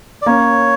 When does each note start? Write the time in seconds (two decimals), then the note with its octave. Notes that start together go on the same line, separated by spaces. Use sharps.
0.22 D5
0.26 A#3 C#4 C#5